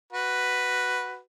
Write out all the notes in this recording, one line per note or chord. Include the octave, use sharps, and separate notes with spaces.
F#4 B4